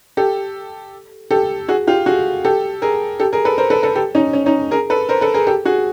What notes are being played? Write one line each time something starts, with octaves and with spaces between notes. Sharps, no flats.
G4 A4
G4 A4
F#4 G#4
F4 G4
F#4 G#4
G4 A4
G#4 A#4
G4 A4
G#4 A#4
A4 B4
A#4 C5
A4 B4
A4 B4
G4 A4
C#4 D#4
C#4
C#4 D#4
G#4 A#4
A4 B4
A#4 C5
A4 B4
G#4 A#4
G4 A4
F#4 G#4